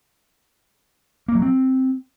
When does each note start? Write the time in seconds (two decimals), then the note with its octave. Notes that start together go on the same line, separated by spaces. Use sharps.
1.28 A#3
1.35 F#3
1.42 C4